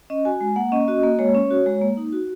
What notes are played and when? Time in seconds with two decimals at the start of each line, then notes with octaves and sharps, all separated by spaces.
0.10 C#4 D#5
0.25 F#4 G#5
0.41 G#3
0.56 A#3 F#5
0.72 C#4 D#5
0.88 F#4 D#5
1.03 A#3
1.19 G#3 C#5
1.35 C#4
1.50 F#4
1.66 G#3
1.82 A#3
1.97 D#4
2.12 F#4